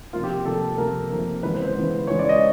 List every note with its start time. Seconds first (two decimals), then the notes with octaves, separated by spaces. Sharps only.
0.13 C3 F3 A#3 F4
0.24 G4
0.45 C3 F3 A#3 A4
0.77 C3 F3 A#3 A#4
1.10 C3 F3 A#3
1.43 C#3 E3 G#3 B3 B4
1.54 C5
1.64 C5
1.75 C#3 E3 G#3 B3
2.07 C#3 E3 G#3 B3 C#5
2.19 D5
2.29 D#5